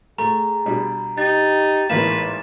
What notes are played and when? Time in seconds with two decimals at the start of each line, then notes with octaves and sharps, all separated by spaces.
0.18 A3 G#4 A#5
0.66 B2 G3 D4
1.18 D#4 G4 A6
1.90 A1 G#2 E3 A#3 B4 E7